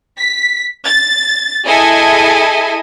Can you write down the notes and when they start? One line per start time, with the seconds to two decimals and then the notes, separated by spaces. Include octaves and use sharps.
0.18 B6
0.84 A6
1.65 E4 G#4 A4 D#5 G#5